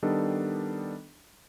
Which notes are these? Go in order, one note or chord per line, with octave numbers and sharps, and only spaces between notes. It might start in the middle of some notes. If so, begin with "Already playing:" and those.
D#3 G3 B3 D4 A4 D#5